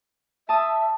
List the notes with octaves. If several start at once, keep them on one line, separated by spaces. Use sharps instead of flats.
E5 A5 D#6